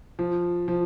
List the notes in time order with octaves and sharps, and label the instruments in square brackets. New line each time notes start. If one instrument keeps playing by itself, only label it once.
[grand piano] F3
F3